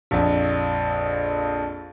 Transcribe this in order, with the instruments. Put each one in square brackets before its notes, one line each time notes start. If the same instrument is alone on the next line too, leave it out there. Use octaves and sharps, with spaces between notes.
[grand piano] A#1 F2